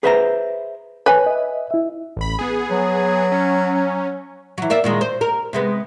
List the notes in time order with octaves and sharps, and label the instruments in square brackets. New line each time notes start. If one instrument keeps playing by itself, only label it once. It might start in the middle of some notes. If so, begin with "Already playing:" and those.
[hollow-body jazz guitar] G#4 B4 C5 E5 A5 A#5
[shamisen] B4 G#5 [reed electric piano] C#5
[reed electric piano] D#5 E5
E4 E5
[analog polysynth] A1 B5
B3 G#4
[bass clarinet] F#3
[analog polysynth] C#4
[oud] E3 F#3
A#3 D5 E5
A#2 D#3 G#3
C5
A#4
C3 G#3 B3